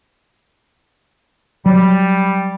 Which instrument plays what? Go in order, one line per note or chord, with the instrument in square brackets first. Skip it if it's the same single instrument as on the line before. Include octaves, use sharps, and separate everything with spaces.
[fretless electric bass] F#3 [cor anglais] G3